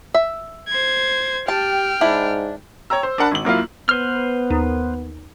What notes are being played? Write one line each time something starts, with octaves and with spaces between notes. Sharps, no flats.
E5
C5 G#6
G4 G5 A5 F6
G#2 D4 E4
C#5 G5 A#5 E6
C5
D4 A#4 F#5 A5 B5
G#1 F#7
F#2 A#3 E4 F4
B3 B4 C5 F6
D#2